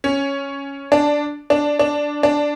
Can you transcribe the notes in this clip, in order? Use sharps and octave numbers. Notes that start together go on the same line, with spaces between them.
C#4
D4
D4
D4
D4